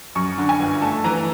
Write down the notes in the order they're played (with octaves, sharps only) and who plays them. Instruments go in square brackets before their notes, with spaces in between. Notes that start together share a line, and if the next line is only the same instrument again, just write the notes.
[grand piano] F#2 C#6
D3
G#5
G1
A3 A5
E3 A#5